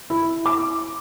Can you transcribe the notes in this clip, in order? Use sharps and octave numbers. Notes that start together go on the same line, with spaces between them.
E4
D6